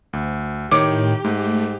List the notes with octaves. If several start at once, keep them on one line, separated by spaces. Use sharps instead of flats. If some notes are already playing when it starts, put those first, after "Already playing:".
D2
A2 D#3 G4 C#5 D6 D7
G#2 A3